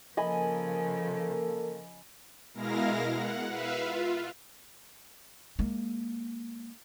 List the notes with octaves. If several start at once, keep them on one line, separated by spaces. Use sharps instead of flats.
C#3 F3 A#3 A4 A#4 D#5 G#5 B5
B2 G#3 E4 A#4 F5 A#6
F#5
B4 E5 F5
F4
G#3 A#3